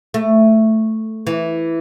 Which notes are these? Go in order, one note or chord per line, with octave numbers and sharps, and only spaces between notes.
A3
E3